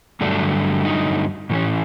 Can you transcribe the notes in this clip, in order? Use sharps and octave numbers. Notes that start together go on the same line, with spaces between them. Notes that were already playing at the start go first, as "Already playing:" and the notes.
G2 D3 F#3 A3 D4
D#4
A2 E3 A3 C#4